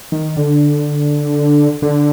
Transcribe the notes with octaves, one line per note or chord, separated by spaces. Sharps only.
D#3
D3
D3